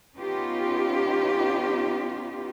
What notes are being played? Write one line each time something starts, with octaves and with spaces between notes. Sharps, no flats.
B3 C#4 D#4 F4 G4